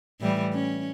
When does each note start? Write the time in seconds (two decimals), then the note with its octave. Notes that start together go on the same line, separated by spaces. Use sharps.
0.21 A2 E3 G3
0.54 C#4